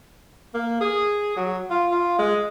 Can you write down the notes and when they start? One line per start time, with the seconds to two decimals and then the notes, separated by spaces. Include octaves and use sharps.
0.54 A#3
0.81 G#4
1.36 F#3
1.70 F4
1.92 F4
2.19 G#3